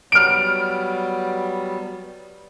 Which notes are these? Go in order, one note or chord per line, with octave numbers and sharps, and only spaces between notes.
F#3 G3 B3 F6 D7